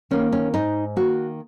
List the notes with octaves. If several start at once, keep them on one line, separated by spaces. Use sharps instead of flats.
D#3 A#3 C#4
C#4
G#2 D#4
D#3 A#3 F#4